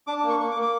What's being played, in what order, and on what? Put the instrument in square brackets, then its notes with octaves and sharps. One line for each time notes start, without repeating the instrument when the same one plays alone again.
[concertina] D4 D6
D6
A#3
C#6
A#3 C#6
D6
A#3
D6